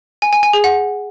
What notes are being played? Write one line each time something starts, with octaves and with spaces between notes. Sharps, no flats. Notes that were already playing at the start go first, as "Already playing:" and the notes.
G#5
G#5
G#5
G#4
F#5